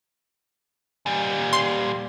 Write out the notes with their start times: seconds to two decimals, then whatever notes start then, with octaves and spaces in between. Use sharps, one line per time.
1.06 A#2 G3
1.53 C6